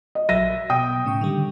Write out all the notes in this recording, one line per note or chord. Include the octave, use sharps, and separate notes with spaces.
D#5
A#1 F#3 E5 A#6 D#7
B2 G5 D#6
A2 C#3 C#6
D3 D#3 G3